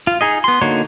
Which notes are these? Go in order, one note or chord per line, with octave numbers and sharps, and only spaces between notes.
F4
D#4 G#4 D#5
B3 C6
D3 A#3 D#4 F#4 C#5